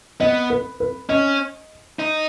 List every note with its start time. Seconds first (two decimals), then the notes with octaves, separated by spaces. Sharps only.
0.20 B3 D#5
0.50 B4
0.80 B4
1.09 C#4 D#5
1.99 D#4